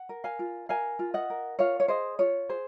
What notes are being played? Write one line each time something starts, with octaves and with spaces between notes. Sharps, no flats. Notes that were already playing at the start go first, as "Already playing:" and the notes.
Already playing: F#5
A#4
F5 G#5
F4
A#4 F5 G#5
F4
D#5 F#5
A#4
F4 C#5 F5
C#5
G#4 C5 D#5
F4 C#5
G#4 C5